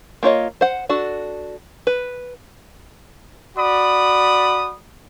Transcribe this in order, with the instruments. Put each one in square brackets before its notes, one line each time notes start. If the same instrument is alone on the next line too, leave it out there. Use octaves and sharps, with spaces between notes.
[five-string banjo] A#3 F4 C#5 D#5
C5 F#5
D4 F#4 A4
B4
[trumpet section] F#4 D5 B5 D#6